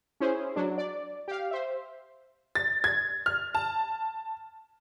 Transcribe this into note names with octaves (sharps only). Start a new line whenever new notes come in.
C#4 E4 G#4 C5
F#3 D4
D5
G4 F5
C5 E5
A6
G#6
F6
A5